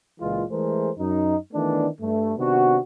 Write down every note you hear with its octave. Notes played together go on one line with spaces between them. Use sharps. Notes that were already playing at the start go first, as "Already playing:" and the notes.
C#2 A#2 E3 G#3 F4
E3 G#3 A3 G#4 A#4 C5
F#2 D#4
D#3 E3 A3 B3 D4
G2 A3
C3 D#3 B3 D4 F#4